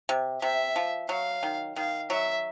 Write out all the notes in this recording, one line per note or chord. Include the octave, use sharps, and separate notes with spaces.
C3
C3 E5
F3
F#3 F5
D#3
D#3 F5
F#3 E5